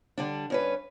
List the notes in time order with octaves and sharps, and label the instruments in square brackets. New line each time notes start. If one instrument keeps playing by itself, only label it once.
[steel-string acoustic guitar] D3 G3 D4
G2 C#4 B4